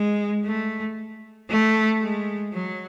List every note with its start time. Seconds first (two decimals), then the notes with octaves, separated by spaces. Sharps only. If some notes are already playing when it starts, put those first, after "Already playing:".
Already playing: G#3
0.45 A3
1.50 A3
2.02 G#3
2.54 F#3